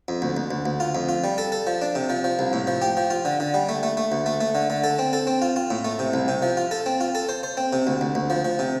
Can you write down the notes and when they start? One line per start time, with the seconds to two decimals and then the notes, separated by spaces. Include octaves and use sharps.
0.08 F2
0.22 D2
0.37 D2
0.51 D2
0.66 D2
0.80 F4
0.95 F2
1.09 F4
1.24 G3
1.38 A4
1.52 A4
1.67 F3
1.82 D4
1.95 C3
2.10 F3
2.24 F3
2.39 C2
2.53 A2
2.67 F3
2.82 G4
2.97 F3
3.10 F4
3.25 D3
3.40 D3
3.54 G3
3.69 A3
3.83 A3
3.97 A3
4.12 D2
4.26 A3
4.41 A3
4.55 D3
4.70 D3
4.84 A4
4.99 C4
5.13 A4
5.27 C4
5.42 F4
5.56 F4
5.70 A2
5.85 A3
5.99 C3
6.13 C2
6.28 C3
6.43 F3
6.57 F4
6.71 A4
6.86 C4
7.01 F4
7.15 A4
7.29 C5
7.43 C5
7.57 C4
7.73 C3
7.87 D2
8.01 D2
8.15 D2
8.30 F3
8.44 F3
8.59 C3